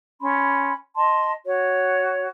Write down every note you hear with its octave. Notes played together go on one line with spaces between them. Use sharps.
C#4 B5 C6
D#5 A5 C6
F#4 C#5